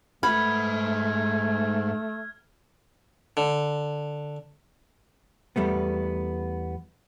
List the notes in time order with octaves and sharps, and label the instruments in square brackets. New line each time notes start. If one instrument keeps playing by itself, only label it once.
[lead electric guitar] G#2 F#5 [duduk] A3 [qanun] B4 B5 [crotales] F6 G#6
[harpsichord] D3
[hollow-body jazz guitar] E2 G3 A3 B3